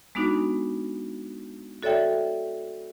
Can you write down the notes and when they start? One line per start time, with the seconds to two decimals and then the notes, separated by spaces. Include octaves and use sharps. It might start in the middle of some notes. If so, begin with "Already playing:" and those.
0.15 G#3 B3 D4 D#4 F#4
1.83 F#4 A4 C#5 D5 E5 G5